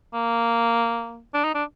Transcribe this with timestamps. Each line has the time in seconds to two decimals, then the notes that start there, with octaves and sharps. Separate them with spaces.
0.14 A#3
1.34 D4
1.44 D#4
1.54 D4